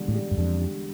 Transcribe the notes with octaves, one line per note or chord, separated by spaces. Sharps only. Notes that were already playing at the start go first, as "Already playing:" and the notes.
Already playing: E1 D3 G3
A2
G3
G2
F2 D3
G3